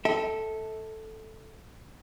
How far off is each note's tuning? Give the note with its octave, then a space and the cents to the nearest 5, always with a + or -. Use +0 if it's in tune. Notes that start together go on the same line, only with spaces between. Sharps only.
A4 +0 E5 -40 G5 +0